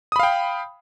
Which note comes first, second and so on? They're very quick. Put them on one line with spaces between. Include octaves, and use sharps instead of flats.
D#6 B5 F5 G5